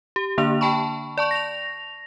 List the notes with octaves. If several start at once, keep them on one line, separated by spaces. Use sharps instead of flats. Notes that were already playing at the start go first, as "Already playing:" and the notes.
G4
D3 A#3 D4 F7
G5 A5 B5 C#6
D5 A5 C#6
A#6 F7